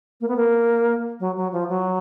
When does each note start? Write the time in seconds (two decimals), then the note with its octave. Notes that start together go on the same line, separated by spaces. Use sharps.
0.20 A#3
0.28 B3
0.36 A#3
1.19 F#3
1.36 F#3
1.52 F3
1.69 F#3